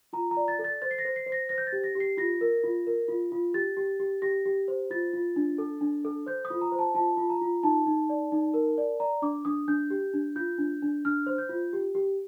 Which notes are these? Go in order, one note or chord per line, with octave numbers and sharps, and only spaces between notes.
F4 A#5
A#5
D5
A6
A4
A6
C5 A6
C7
A#6
C5
C7
C5
A#6
C5 A#6
G6
A6
G4
A#6
G4
C7
F4 A#6
A#4
F4
A#4
F4
F4
G4 A6
G4
G4
G4 A#6
G4
C5
F4 A6
F4
D4
A4
D4
A4
C5 G6
D#6
F4
A#5
C5
A5
F4 A5
F4
A#5
F4
D#4 A5
D#4
D5
D#4
A#4
D5
D5 A#5
D4 D6
D4 D#6
D4 G6
G4
D4
F4 G6
D4
D4
D4 F6
C5
G6
F4
G4
G4